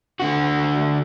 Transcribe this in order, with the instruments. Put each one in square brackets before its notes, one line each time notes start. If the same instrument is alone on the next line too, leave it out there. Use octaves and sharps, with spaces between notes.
[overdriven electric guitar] D3 F#4